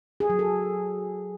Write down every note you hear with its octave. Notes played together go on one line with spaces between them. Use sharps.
G#4
F#3
A4